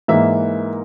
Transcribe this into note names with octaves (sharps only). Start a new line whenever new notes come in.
G#2 E3 A#3 E5